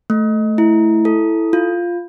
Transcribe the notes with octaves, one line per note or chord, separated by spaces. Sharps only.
A3
E4
A4
F4